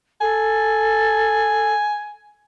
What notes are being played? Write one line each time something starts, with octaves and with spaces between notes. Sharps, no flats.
A4 G#5